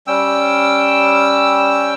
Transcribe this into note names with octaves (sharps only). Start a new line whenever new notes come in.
G3 C#4 G5 E6